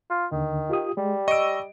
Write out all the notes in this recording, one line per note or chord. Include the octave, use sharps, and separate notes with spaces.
F4
D#2 D3 D#3
F4 G4 D#6
G3 G#3
D#5 C#6 E6 D7